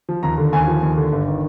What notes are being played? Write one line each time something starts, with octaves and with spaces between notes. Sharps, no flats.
F3
D#2 A#5
D3
D#2 G#5
F3
D#2
D3
G1
D#3